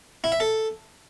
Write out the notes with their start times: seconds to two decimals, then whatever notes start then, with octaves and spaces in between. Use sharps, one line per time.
0.24 E4
0.32 E5
0.40 A4